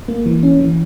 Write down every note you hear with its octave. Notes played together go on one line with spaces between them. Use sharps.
A#3
E3
C#4
E3